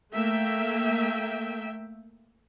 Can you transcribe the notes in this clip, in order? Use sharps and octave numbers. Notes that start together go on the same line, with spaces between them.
A3 A#3 E5 G5